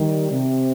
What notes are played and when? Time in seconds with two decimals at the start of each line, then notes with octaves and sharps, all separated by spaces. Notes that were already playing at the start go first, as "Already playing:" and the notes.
Already playing: D#3 G3
0.32 C3